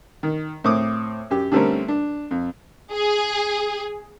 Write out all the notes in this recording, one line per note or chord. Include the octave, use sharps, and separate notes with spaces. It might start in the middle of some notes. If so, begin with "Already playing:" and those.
D#3
A2 C4 D6 D#6
F#2 G4
D3 G3 A3 C4 C#4 A#4
D4
F2
G#4